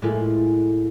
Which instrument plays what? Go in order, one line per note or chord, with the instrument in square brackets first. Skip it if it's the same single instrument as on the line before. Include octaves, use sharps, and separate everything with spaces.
[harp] A2 G#3 A#3 E4 F4